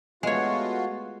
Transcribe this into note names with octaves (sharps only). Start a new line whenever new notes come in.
G#3 A3 B3 F4 F#4 C#5